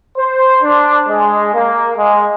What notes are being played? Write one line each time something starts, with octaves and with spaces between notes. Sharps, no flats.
C5
D4
G#3
A#3
G#3